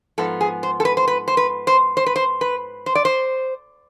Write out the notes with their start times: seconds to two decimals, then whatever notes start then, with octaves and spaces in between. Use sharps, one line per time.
0.18 G#2 F3 B3 A4
0.41 G#4
0.63 C5
0.80 A4
0.85 B4
0.97 C5
1.08 B4
1.28 C5
1.37 B4
1.67 C5
1.97 C5
2.06 B4
2.16 C5
2.41 B4
2.86 C5
2.95 D5
3.05 C5